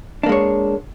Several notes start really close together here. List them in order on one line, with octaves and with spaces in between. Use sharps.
D4 A#3 G#3 C#5